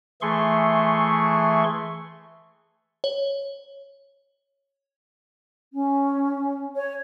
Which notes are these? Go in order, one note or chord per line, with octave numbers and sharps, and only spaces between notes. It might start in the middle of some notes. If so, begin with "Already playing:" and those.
E3 A3 G#4 C6 C#6
C#5
C#4
C#5